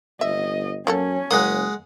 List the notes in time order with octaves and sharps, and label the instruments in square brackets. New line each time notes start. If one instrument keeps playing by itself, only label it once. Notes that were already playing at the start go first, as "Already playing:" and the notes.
[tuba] G1 [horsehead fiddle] D#5 [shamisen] E5
[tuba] F#2 [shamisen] F#3 A#3 A4 [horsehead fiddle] C#4
[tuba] F#1 [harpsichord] G#3 F#5 D#6 [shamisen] A#3